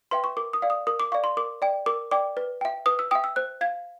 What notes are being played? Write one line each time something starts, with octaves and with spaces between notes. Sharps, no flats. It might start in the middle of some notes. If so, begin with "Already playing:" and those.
B4 E5 G5 C6
C#6
A#4 D6
D#6
D5 F5
D#6
A#4 D#6
D6
D5 F5 C#6
C6
A#4 D6
D5 G5
A#4 D6
D5 G5 D6
B4
E5 G5
B4 D#6
E6
E5 G5 D#6
E6
C5 F#6
F5 G#6